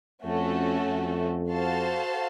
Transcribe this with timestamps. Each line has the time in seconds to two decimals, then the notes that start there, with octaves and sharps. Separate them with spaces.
0.25 F2 A3 C#4 F#4 A4
0.88 F2
1.50 F#4 A4 C5 F5 A5